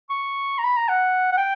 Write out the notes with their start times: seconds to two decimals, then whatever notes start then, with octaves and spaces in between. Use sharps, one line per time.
0.10 C#6
0.58 A#5
0.64 B5
0.77 A#5
0.89 F#5
1.32 F#5
1.37 G5